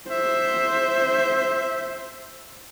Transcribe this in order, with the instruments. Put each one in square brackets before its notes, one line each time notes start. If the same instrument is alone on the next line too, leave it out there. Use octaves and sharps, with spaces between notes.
[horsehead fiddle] C5 [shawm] E5